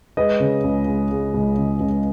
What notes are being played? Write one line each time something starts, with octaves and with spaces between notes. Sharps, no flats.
G#3 B4 D#5
C#3
C#2
G#3
G#3
C#2
C#3
C#2